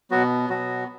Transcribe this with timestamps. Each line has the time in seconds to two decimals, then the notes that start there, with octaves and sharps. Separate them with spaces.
0.11 B2 F#3 B3 F#4
0.49 B2 F#3 B3 F#4